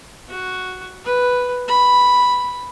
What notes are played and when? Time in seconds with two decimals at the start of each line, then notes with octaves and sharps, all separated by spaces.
0.29 F#4
1.05 B4
1.68 B5